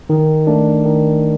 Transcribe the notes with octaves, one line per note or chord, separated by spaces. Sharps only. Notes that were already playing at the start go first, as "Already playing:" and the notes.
D#3
A3 D4
D#3